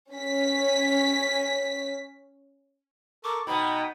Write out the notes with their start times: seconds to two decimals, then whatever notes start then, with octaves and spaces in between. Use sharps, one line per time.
0.12 C#4 B6
3.24 A4 A#4 C#6 D6
3.47 B2 B3 D#4 G5 B5